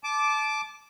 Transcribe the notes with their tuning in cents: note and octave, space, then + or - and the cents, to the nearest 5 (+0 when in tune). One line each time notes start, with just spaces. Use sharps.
A5 -25 D6 +0